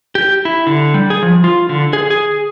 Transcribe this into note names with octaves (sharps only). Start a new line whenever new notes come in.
G4
E4
D3
G3
G#4
F3
F4
D3
G#4
G#4